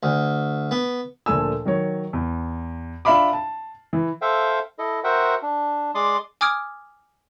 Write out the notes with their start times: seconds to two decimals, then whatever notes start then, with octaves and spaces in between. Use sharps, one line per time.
0.03 D2
0.71 B3
1.26 D2 A#2 F3 A3 G#5 E6
1.65 D#3 F#3 C#5
2.13 E2
3.05 D4 F4 E5 F5 B5 D6
3.33 A5
3.93 E3
4.22 A4 C5 E5 F5 G5
4.79 E4 A4 D#5
5.04 F#4 A#4 C5 E5 F#5 G5
5.43 D4
5.95 G#3 D5 C6 D6 D#6
6.41 G#5 D6 D#6 F6 G#6 D7